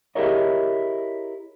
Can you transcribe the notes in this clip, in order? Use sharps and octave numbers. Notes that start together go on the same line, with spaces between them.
E4 G4 G#4 A#4 C#5 D#5